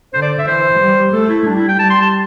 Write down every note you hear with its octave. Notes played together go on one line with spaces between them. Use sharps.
D3 C5
D5
E5
E3 C5
G3
A3 A4
E4
G3 D4
E4
G5
G3 A5
C6
A5